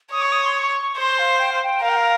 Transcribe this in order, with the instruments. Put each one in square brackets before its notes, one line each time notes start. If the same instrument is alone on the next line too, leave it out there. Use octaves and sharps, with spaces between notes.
[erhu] C#5 [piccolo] D#6
[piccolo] C#6
D#6
C6
C#6
[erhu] C5 [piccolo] C6
[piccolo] F5
G5
F5
G5
[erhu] A#4 [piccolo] F5
[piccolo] G5
F5